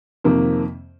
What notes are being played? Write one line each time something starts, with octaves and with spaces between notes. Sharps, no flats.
F2 C3 D#3 A#3